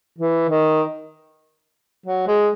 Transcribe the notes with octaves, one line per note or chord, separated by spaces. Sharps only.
E3
D#3
F#3
G#3